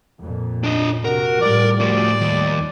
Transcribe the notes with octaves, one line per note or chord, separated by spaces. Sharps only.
F2 A#2
D4 D#5
C3 F#4 A#4
A2 F3 G3 D5
A3 F#4 D5
D#2